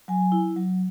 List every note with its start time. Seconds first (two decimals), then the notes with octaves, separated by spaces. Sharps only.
0.08 F#3 G#5
0.32 E4
0.56 F#3